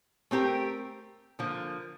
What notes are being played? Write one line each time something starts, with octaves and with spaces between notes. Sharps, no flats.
A3 C4 G4 A#4
D3 F3 A#3